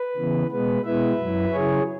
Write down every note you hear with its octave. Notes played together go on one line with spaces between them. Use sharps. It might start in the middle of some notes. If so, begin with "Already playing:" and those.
Already playing: B4
C#3 E3 B3
B2 G#3 B3 B4
B2 G#3 B3 E4 B4 E5
F#2 F#3 E4
C#3 F#3 E4 G#4 C#5